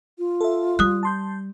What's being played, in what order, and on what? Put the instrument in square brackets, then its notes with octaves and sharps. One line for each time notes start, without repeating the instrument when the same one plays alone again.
[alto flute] F4
[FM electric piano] A4 E5
[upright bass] G3 [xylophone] D#6 F#6
[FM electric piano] A5 C6 G6